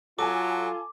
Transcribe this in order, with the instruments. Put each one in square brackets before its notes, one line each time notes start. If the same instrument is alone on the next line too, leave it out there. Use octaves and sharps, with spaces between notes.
[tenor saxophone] F#3 [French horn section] F4 [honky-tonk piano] A4 G#5 [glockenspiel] D6